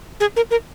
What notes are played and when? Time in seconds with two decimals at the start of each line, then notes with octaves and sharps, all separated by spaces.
0.20 G#4
0.36 A#4
0.51 A#4